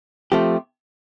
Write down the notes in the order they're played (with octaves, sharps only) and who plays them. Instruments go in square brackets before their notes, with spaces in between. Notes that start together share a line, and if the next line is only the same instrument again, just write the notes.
[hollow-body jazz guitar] F3 A3 C4 G4